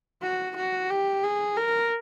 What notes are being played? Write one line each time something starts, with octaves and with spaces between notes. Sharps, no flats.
F#4
F#4
G4
G#4
A#4